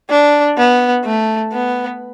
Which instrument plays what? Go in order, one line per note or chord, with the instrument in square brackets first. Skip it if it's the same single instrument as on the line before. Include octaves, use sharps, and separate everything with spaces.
[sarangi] D4
B3
A3
B3